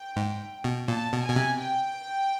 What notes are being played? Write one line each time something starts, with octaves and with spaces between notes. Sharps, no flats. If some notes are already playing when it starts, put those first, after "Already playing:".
Already playing: G5
G#2
B2
A#2 A5
B2
B2 G#5
C3
G5